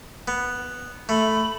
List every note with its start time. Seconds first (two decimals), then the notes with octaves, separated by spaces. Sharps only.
0.28 B3
1.09 A3 B5